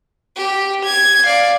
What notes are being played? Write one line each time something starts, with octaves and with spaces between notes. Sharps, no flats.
G4
G#6
D5 F5